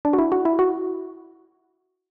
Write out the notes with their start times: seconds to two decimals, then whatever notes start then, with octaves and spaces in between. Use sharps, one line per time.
0.05 D4
0.13 F#4
0.18 E4
0.32 F#4
0.45 E4
0.59 F#4